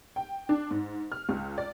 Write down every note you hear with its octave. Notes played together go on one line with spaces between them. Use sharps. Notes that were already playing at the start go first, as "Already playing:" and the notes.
G5
D4
G#2
F6
C#2
D5